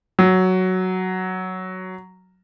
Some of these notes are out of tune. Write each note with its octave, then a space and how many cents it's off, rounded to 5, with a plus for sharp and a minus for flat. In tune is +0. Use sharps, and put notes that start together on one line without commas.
F#3 +5